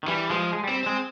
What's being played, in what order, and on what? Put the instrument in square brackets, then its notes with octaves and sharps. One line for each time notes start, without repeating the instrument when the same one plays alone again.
[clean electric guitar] D#3
[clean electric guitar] E3 [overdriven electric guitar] G3
[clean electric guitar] F3 [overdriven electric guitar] G#3
[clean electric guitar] G#3
[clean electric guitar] G3 [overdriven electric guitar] C4
[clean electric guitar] G#3 [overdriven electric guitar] C4